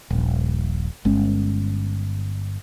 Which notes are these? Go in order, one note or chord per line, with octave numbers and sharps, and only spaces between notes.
D#1 A#1
G1 G#3 C#4